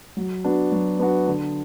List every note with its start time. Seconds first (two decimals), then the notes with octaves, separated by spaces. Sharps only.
0.17 F#3
0.44 B3 D4 F#4
0.72 F#3
0.99 B3 D4 F#4
1.27 D3